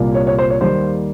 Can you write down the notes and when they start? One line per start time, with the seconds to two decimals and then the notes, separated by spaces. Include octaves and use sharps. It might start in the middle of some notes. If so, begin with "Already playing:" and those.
Already playing: C2 A#2 G3 A#3
0.15 C#5
0.27 C#5
0.39 C5
0.50 C#5
0.61 D#2 D#3 G3 A#3 C5